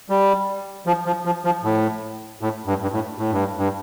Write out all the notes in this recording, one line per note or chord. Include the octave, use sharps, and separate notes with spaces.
G3
F3
F3
F3
F3
A2
A2
G2
G2
A2
A2
G2
G2